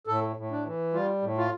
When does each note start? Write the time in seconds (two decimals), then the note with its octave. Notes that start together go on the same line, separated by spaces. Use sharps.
0.07 A2 A4
0.36 A2
0.51 D4
0.65 E3
0.93 G3 F4
1.22 A2
1.37 F4